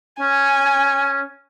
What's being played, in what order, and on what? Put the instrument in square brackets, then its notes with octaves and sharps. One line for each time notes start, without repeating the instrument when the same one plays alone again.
[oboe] C#4 [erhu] G#5